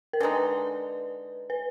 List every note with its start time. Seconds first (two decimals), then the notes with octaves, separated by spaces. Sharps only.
0.13 A#4
0.20 D3 G#3 D#4 B4
1.50 B4